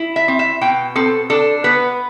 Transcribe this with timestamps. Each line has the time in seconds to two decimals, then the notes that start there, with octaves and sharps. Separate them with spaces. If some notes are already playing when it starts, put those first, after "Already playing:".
Already playing: E4
0.16 E5
0.28 C4
0.39 E5
0.61 B2 G5
0.95 C4 A4
1.30 D4 A4
1.64 B3 B4